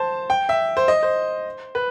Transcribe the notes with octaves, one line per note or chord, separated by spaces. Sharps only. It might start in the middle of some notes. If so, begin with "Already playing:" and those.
Already playing: C5 A5
G5
E5
C5
D#5
C5
B4